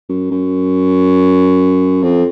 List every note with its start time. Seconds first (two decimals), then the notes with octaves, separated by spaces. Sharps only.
0.09 F#2
0.31 F#2
2.03 F2